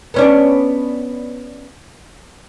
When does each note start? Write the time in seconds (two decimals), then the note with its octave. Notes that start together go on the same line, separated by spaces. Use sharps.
0.14 B3 C#4 D4